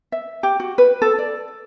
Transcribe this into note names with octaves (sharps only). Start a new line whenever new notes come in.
E5
G4
F#4
B4
A4
D5